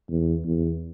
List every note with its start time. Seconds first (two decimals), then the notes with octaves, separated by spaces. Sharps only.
0.09 E2
0.45 E2